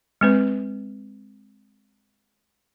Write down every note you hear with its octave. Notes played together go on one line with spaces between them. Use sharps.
G#3 C4 B4